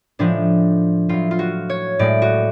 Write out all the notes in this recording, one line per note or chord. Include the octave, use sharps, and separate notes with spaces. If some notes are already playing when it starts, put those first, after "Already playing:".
A2 F3 G#3 D4
A2 F#3 F4
F4
F#4
C#5
A2 G#3 D5
F#4